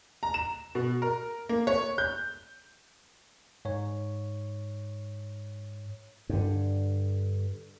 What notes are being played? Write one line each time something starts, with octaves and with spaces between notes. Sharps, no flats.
A#5
E7
B2
A#4
A#3
C#5
G6
G#2 C#5
G2 D3